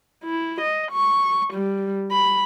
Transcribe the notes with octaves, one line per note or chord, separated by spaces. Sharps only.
E4
D#5
C#6
G3
B5